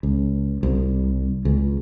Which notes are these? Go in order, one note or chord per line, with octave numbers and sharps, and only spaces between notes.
C#2
C2
C#2